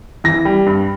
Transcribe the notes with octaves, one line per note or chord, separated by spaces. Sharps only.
E3 A#6
G3
G2